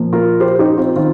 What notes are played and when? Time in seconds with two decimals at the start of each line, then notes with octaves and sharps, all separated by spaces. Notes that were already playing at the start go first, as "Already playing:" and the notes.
Already playing: A#2 F3 A#3
0.13 F4 A#4
0.40 G4 C5
0.59 D#4 G4
0.77 C4 F4
0.96 D#3 C4 F4